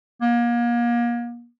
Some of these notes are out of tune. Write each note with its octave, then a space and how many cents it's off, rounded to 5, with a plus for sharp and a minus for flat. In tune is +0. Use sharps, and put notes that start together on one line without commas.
A#3 +35